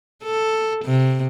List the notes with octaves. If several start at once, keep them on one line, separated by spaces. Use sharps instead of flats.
A4
C3